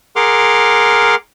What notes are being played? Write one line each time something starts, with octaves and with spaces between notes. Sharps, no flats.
G#4 A#4 F#5 C6 D6 F6